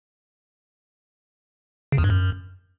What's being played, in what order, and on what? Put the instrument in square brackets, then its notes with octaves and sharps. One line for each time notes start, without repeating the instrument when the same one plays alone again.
[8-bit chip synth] C#3
E2
G2
F#2